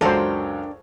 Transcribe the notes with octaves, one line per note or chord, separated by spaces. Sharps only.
C#2 F#2 D4 A4 A#4 C5 G5